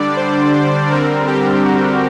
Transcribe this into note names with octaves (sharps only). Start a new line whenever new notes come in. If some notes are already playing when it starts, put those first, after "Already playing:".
Already playing: D3 G3 D4 D5
C5
C5
D3 G3 C4 A#4
G4
F#4